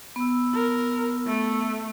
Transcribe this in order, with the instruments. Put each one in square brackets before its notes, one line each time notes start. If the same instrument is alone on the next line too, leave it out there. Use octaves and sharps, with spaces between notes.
[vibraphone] B3 E6
[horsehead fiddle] A#4
A3